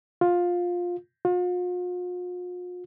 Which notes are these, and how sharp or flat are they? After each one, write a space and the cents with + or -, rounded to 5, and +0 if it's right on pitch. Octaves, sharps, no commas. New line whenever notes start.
F4 +15
F4 +45